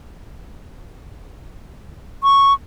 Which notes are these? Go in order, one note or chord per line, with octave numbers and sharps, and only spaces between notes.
C#6